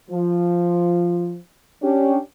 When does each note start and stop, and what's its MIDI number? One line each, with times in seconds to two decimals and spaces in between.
0.11 1.36 53
1.83 2.17 61
1.83 2.17 62
1.83 2.17 67